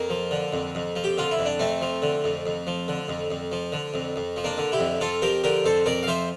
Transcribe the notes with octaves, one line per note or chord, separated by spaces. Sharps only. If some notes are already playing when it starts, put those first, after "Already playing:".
Already playing: F2 A#3
F3
D3
F2
F2
F3
G4
D3 F4
E4
F2
D4
F2 A3 C4
F3
D3
F2
F2
F3
D3
F2
F2
F3
D3
F2
F2
F3
A#3 D4
D3
E4 G4
F2
F2 F4 A4
F3 G4 A#4
D3 G4 A#4
F2 A4 C5
F2 A#4 D5
F5
F3 C5 E5